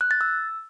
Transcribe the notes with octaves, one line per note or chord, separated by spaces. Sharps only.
F#6
A6
E6